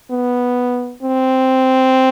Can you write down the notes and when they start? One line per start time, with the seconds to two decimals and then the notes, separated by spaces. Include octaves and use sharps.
0.11 B3
1.03 C4